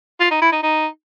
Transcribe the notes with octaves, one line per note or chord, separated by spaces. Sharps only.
F4
D#4
E4
D#4
D#4